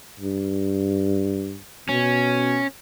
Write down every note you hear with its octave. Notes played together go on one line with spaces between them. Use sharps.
G2
B2 C#4